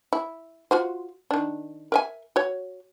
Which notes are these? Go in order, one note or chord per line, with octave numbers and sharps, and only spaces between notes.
E4
F4 F#4 C5
D#3 D4
A#4 E5 G#5
F#4 C#5